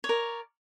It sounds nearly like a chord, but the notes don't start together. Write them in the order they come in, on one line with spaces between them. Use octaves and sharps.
C#5 D5 A#4